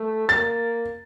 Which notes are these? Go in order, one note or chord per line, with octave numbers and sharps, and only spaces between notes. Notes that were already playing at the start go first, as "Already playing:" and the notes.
Already playing: A3
A#3 A6